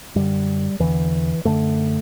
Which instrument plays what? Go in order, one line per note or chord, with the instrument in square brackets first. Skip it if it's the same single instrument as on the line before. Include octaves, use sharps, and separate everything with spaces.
[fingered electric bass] F#2 D3 G3
E2 D3 E3
F#2 D3 A3